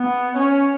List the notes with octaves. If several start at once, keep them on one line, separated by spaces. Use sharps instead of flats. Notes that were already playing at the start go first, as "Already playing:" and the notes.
Already playing: B3
C#4